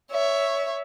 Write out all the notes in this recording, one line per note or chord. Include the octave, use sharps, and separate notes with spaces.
C#5 E5